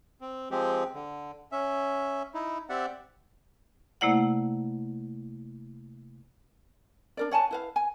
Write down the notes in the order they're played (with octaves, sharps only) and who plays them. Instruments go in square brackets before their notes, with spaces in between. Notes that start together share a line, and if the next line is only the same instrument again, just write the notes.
[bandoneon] C4
F3 G#3 C4 G4
D3
C#4 E5
D#4 E4
C4 G4 D5 E5 F#5
[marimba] C3 A3 A#3 E4 D5 F#5
[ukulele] D4 A#4 D5
C#5 F#5 G#5 A5
E4 B4 F5
G#5